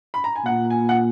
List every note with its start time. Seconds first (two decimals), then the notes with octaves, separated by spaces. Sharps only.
0.14 B5
0.24 A#5
0.36 G#5
0.45 A#2 F#5
0.70 G#5
0.89 F#5